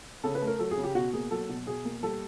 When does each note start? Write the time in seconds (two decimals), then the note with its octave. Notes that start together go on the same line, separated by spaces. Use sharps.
0.24 C#3 A4
0.35 B4
0.42 A3
0.47 A#4
0.59 F#3 A4
0.71 G#4
0.77 C#3
0.84 G4
0.95 B2 F#4
1.13 A#3 G#4
1.31 F#3 A4
1.49 B2
1.67 B2 G#4
1.85 A#3
2.03 G3 A4